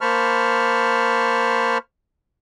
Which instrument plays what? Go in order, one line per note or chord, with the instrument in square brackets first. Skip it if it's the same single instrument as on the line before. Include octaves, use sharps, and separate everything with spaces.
[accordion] A#3 C5 A5 B5 C#6 F6